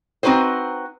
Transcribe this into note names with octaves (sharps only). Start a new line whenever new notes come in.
C4 D#4 F#4 B4 C5